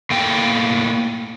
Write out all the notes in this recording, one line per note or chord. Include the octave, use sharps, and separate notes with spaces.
A2 A#3 G5